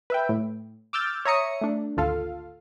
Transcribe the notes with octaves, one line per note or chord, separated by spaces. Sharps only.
B4 E5 G5
A2
D6 E6 F6 G6 A6
C#5 E5 A#5 D#6 C#7
A3 D4
G#1 D2 F4 A4 F5